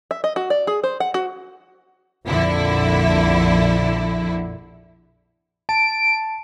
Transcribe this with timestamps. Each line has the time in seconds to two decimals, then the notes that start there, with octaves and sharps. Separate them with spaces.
0.11 E5
0.24 D#5
0.36 F#4
0.50 D5
0.67 G#4
0.84 C5
1.00 F#5
1.14 F#4
2.26 A#1 F2 D3 E4
5.69 A5 D7